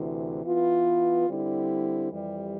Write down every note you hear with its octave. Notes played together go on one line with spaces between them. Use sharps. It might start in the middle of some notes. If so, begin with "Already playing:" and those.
Already playing: D2 C3 E3
E3 B3 F4
D3 G3 C4 E4
F2 E3 G3